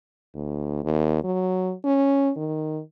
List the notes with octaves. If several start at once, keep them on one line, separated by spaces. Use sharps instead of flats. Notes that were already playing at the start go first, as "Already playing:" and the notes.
D2
D#2
F#3
C#4
D#3